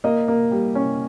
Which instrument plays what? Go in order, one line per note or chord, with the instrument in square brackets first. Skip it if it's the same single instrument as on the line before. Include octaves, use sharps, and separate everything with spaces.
[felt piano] A#3 D#5
A#3
G3
C#4